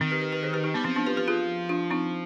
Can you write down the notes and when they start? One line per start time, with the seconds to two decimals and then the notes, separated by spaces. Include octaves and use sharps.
0.01 D#3 C4
0.11 G4 B4
0.22 G4 B4
0.32 G4 B4
0.43 G#4 C5
0.53 G4 B4
0.64 D#4 G4
0.74 G3 B3
0.85 F3 C4
0.96 B3 D4
1.06 G4 B4
1.17 G4 B4
1.28 F4 G#4
1.69 D4 F4
1.90 C4 D#4